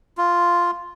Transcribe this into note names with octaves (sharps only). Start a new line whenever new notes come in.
F4